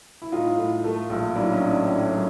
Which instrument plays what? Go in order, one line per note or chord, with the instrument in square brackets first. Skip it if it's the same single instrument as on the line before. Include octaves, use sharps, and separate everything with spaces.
[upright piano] E4
A2 D#4 F4
A2
A3
A#1
F#3 D4 E4
C#4 D#4
A2
D4
A2 C#4
D4
F#3